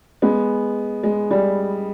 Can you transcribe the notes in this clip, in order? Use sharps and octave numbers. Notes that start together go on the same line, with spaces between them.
G#3 B3
G#3
G3